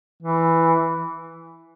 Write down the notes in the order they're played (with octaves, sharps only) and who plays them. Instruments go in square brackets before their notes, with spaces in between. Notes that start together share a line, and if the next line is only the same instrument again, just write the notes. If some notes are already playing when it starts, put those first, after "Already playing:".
[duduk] E3